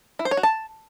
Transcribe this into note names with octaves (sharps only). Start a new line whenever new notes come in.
E4
C5
C#5
F#4
A5